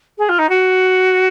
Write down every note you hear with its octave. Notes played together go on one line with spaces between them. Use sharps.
G#4
F4
D#4
F#4